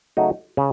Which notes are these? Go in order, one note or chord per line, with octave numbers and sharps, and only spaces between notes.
C#3 F#3 A3 D#4 F#4
C#3